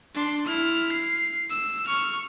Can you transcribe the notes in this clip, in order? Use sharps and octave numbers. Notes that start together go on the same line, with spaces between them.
D4 C6
E4 F6
C7
E6
C#6 F6